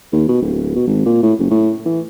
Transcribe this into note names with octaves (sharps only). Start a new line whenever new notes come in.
D#2
B2
D1
B2
G#1
A#2
A2
F#1
A2
E3